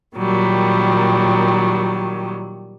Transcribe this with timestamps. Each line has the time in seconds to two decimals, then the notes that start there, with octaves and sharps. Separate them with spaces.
0.16 A#2 D#3 F#3 G3